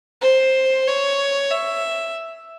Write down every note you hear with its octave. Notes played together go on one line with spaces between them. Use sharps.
C5
C#5
E5